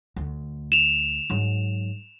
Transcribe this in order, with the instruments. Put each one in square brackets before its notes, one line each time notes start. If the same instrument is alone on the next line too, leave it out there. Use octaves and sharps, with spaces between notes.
[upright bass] D2
[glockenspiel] E7 F7
[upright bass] G#2 F#3